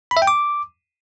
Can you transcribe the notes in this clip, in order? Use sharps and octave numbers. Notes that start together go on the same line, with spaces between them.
B5
E5
G5
D6